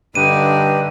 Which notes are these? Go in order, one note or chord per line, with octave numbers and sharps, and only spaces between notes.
G2 D3 D#4 G4 B4 D#7